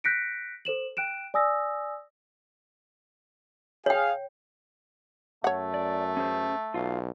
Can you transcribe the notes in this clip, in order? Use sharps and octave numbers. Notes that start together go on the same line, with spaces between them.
F#6 G6 A#6 B6 C#7 D7
A4 C5 E7 F#7
G5 F#6 D7 E7
D5 G#5 D#6 E6 A#6
G#4 C#5 F5 G5
F#2 A3 C#5 F#5
D5
C#4 G#4 C5
B1 F4 F5